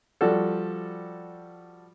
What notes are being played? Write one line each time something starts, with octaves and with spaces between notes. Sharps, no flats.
F3 G3 F#4 A4